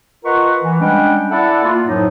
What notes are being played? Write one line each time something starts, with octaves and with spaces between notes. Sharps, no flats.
F4 A#4 B4 D#5 F#5 C#6
E3
G3 G#3 C#4 D4 F#5 G5
E4 A4 D5 E5 F#5
A#3 F4
F#2 A2 F3 F#3 D#4